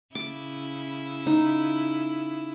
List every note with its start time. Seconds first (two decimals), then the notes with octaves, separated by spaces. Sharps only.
0.15 C#3 E4 D6
1.26 D#4